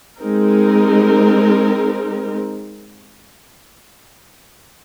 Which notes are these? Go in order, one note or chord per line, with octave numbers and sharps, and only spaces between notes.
G#3 C4 D#4 A#4